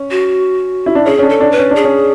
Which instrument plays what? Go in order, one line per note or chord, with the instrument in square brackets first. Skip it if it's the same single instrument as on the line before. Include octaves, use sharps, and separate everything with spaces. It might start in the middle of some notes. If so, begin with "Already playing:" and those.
Already playing: [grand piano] C#4
[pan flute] F#4
[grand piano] E4
D4
[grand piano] C#4 [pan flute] G#4
[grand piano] C#4
D4
[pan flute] A4
[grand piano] D4
[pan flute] B4
[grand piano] C#4
[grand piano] D4 [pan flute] G#4
[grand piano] C#4